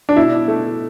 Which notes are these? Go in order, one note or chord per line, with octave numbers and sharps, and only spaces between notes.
D4
B2 E4
A3